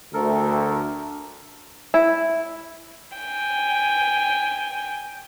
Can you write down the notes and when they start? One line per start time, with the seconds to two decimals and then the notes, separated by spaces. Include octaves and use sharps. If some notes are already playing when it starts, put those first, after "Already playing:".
0.13 D2 A4 A#4
1.94 E4
3.17 G5 G#5